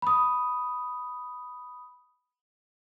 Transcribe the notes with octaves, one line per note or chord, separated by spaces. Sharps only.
B5 D#6